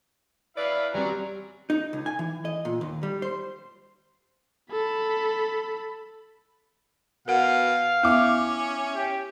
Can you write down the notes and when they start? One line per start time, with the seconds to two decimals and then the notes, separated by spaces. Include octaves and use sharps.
0.57 E4 B4 D5 F5
0.94 F#3 G3 C4 D5 G#5 A#5
1.70 D#4
1.93 C#2
2.06 G#5
2.19 E3
2.45 D#5
2.65 A#2
2.81 D#2
3.03 G3
3.22 C5
4.71 A4 B5
7.28 B2 A#4 F5 F#5
8.03 B3 C#4 E4 D6
8.95 G4